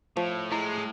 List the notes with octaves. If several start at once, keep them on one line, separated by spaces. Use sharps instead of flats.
A2 F3
G#3 E4